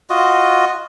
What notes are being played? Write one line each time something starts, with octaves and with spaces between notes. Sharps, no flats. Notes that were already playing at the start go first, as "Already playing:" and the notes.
F4 F#4 D#5